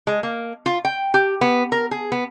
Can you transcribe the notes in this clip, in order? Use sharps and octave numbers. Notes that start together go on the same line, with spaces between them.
G#3
A#3
F4
G5
G4
B3
A#4
G#4
B3